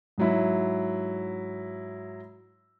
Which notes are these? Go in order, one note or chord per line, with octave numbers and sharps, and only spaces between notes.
G#2 F#3 E4